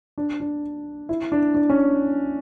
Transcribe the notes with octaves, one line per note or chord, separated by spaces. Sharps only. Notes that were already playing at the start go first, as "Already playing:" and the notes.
D4
D4
E4
D4
D4
C#4